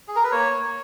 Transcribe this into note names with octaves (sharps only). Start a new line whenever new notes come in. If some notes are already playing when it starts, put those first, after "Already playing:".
G#4
A#4
B4
A#3 C#5
A#3